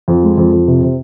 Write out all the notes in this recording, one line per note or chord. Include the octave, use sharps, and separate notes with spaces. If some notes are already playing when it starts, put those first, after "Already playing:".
F2
G#3
F2
F2
C3
C3